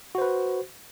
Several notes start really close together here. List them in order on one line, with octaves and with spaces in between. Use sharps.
F#4 C5 B4